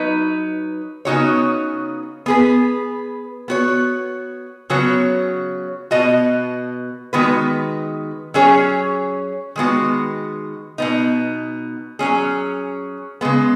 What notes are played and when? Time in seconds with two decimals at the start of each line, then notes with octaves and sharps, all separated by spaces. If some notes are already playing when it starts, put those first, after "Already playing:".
Already playing: F#3 D#4 B4
1.05 C#3 B3 D#4 F#4 C#5
2.26 B3 G#4 B4
3.48 B3 F#4 C#5
4.70 C#3 F#3 B3 F#4 C#5
5.91 B2 B3 F#4 D#5
7.13 D#3 G#3 B3 F#4 B4
8.34 F#3 C#4 G#4 C#5
9.56 D#3 G#3 B3 F#4
10.78 B2 B3 D#4
11.99 F#3 C#4 G#4
13.21 C#3 G#3 B3